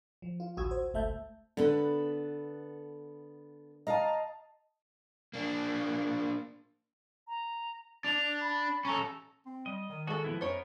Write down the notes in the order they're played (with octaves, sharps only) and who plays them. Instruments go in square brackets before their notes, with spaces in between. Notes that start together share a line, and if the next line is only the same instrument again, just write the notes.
[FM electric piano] F3
F4
A1 D2 F#4 D#6 E6 G#6
C5
G1 C#2 A3 E5 A5 G6
[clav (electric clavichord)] D3 [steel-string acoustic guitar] B3 A4 B4
[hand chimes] D#5 A5 [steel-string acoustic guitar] F5 A#5
[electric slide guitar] A#3 D4
[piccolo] A#5
[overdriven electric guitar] D4 [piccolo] F7
[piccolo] B5
[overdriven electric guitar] C#4 A4 [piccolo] A#5
[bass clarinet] C4
[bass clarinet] G3 [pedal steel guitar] D#5
[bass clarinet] D#3
[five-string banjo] G#3 A4 [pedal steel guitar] F#4
[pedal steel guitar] F3 B3 E4
[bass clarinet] F#2 [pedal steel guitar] B3 A#4 [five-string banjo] C5 C#5